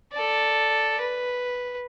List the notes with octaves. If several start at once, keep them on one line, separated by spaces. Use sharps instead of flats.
A4 D5
B4